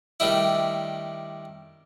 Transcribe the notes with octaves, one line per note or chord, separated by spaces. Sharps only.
D#3 G3 A3 D4 E4